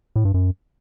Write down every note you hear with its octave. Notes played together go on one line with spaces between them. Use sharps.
A2
G2
F#2